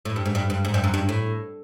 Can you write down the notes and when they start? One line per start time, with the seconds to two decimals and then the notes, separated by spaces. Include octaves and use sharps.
0.05 A2
0.16 G2
0.26 G#2
0.35 G2
0.50 G2
0.65 G#2
0.74 G2
0.84 F#2
0.94 G2
1.09 A2